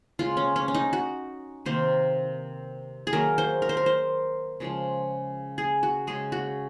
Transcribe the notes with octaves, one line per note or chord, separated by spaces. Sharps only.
C#3 G#3 F4
C#4
C#4
C#4
D#4
F#4
C3 D#3 A#3 C5
G#4
D#3 F#3 A#3 A#4
C5
A#4
C5
A#4
C5
C#3 F3 G#3
G#4
F#4
C#3 G#3 G#4
F#4